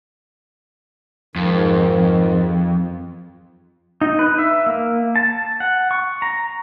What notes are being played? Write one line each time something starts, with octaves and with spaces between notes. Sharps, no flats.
F2 G#2 D#3
D#4
B4
E5
A#3
A5
F#5
C#6
A#5